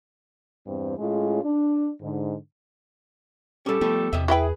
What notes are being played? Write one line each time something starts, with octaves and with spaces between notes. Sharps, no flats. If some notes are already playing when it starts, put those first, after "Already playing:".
E2 G2 C4
A2 G#3 C#4 F4 G#4
D4
G#2 D3
G3 C#4 G4 A4
F3 G3 A3 B3
E2 C3 D#5 E5
E4 G#4 B4 E5 G5 B5